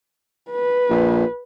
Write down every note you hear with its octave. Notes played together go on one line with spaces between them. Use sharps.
B4
A#1